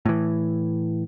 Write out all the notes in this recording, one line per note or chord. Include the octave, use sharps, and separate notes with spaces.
A2 E3